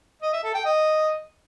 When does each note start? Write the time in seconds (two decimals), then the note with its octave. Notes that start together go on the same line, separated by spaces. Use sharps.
0.22 D#5
0.33 E5
0.44 A4
0.54 G5
0.65 D#5